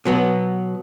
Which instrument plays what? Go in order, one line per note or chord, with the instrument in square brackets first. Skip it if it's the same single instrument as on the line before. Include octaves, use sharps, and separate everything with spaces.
[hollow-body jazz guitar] B2 F#3 B3